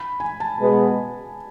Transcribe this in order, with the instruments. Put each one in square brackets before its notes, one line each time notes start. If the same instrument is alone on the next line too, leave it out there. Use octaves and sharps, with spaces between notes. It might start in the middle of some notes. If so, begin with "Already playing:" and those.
Already playing: [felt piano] B5
G#5
A5
[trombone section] B2 G#3 B3